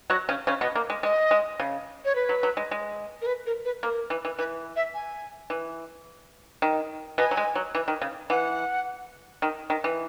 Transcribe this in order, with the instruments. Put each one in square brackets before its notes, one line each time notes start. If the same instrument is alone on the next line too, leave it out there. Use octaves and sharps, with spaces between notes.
[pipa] F#3 F#4
C#3 C#4
C#3 C#4
B2 B3
A#3
G#3
[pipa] G#3 [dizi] D#5
[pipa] G#3
C#3
[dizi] C#5
B4
[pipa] F#3
F#3
G#3
G#3
[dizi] A#4
B4
A#4
B4
[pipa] A#3 [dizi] A#4
[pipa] E3
E3
[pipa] E3 [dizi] B4
[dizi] E5
G#5
[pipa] E3
D#3
[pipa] B2 B3 [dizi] G#5
[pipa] F#3
G#3
F#3
E3
D#3
C#3
[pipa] E3 [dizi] F#5
[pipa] D#3
D#3
E3